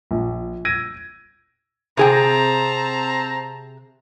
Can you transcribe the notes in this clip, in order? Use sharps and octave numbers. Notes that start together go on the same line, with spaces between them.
A#1
E6 G#6 A#6 D7 D#7
C3 C4 G#4 G5 A5 A#5